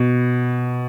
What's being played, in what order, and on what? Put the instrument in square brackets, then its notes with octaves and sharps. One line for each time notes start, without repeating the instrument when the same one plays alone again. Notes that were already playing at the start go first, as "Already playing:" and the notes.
Already playing: [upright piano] B2